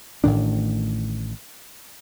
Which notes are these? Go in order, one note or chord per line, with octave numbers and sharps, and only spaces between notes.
A1 A2 D#3 D4